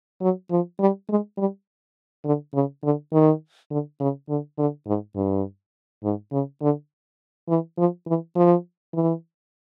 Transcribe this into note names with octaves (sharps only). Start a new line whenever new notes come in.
F#3
F3
G3
G#3
G3
D3
C#3
D3
D#3
D3
C#3
D3
D3
G#2
G2
G#2
C#3
D3
E3
F3
E3
F3
E3